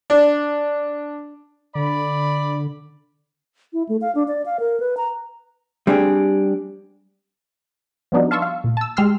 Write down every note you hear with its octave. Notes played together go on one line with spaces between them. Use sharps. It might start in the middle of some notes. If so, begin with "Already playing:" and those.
D4
D3 D5 B5
E4
A3
F5
D4
D5
F5
A#4
B4
A#5
G3 C4 D4 G4 G#4
F3 G3 B3 D4 D#4 F#4
F5 A5 C6 C#6 E6
F5
A#2
A5 E6
G#3 G4 C6 E6 F6 C7